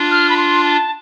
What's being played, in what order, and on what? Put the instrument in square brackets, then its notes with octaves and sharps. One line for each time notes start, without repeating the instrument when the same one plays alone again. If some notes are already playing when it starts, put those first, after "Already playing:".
Already playing: [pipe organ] D4 F4
[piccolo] F6
B5
C6
A5